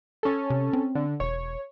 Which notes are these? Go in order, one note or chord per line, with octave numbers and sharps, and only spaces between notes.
C#4 A4
C3
C4
D3
E1 C#5